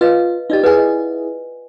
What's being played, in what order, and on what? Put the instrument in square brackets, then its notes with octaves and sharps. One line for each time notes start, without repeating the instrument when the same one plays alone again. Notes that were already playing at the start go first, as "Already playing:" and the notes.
[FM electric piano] F4 [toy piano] B4 D#5 F5
[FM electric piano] D#4 G4 [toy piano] F4 D5 D#5
[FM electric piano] E4 G#4 [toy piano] B4 F#5 G#5
[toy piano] D#5